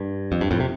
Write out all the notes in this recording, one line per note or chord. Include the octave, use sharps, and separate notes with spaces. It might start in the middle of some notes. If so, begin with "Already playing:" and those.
Already playing: G2
F2
G2
F2 A2
C3